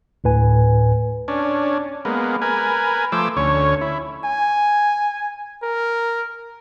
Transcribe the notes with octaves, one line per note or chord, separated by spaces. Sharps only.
D2 A2 B4 G#5
C#4 D4
G#3 A#3 B3
A#4 B4 G#5
F3 A3 C5 D6 E6
D2 C#4 C#5
E4
G#5
A#4